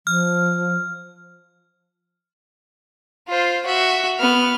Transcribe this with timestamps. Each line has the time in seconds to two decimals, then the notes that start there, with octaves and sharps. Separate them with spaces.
0.07 F3 F6
3.29 F4 C5
3.66 F#4 E5
4.20 B3 F6